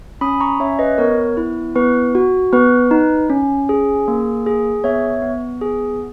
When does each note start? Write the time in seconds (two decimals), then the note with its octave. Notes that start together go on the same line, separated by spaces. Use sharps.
0.21 C#4 B5 D#6
0.41 A#5 C#6
0.60 C#4 C#5 E5
0.79 B4 D#5
0.98 B3 A#4 C#5
1.37 E4
1.75 B3 B4
2.15 F#4
2.53 B3 B4
2.91 D#4
3.29 C#4
3.69 G#4
4.08 A#3
4.46 G#4
4.84 B3 C#5 E5
5.22 B3
5.61 G#4